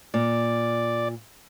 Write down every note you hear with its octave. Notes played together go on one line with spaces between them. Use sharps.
A#2 D5